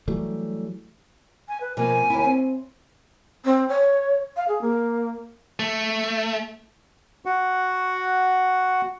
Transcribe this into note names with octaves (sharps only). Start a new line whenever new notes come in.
E3 F#3 G3 A3
G#5
B4
B2 F3 A#3 G#5
D#2 E4
C4
C4
C#5
F5
G#4
A#3
A3
F#4 F#5